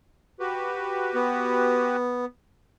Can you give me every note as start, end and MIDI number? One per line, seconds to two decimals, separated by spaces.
0.40 1.96 66
0.40 1.96 67
0.40 1.96 71
1.14 2.25 59